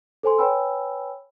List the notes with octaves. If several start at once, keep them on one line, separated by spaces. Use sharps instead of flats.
A4 C5 G#5 C6
B4 C#5 G5 G#5 B5 E6